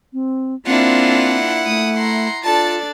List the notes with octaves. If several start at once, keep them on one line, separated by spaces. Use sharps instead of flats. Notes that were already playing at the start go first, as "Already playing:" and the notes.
C4
A#3 C4 D4 E4 F4 F#5
A3 D#6
A#5 C6
D4 F4 A4 D5 A5 A6